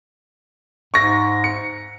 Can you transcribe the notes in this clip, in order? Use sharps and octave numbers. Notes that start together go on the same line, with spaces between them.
G#2 C#6 A#6
C#7